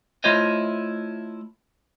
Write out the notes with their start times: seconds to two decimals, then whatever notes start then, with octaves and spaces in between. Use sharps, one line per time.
0.24 A3 E4 F4 C5 C#5 D#5